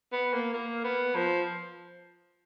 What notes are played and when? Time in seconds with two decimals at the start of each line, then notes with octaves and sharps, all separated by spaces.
0.12 B3
0.33 A#3
0.53 A#3
0.84 B3
1.15 F3